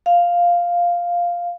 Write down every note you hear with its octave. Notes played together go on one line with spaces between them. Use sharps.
F5